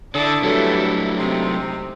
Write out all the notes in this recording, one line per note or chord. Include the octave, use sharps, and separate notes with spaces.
D3 D4 E4 A4 D5 A5 D#6 A6
E3 F#3 G3 A3 B3 C#4 F#4 A4
C3 G#3 C4 D#4